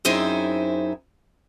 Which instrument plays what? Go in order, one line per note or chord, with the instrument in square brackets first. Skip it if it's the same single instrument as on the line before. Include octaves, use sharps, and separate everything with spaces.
[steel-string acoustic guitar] F#2 C4 D#4 E4 G#4 C5